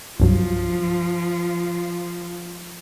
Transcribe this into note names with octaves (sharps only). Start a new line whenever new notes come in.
C2 G2 F3 F#3